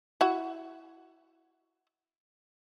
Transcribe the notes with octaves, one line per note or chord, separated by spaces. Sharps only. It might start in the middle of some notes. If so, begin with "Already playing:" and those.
E4 F#4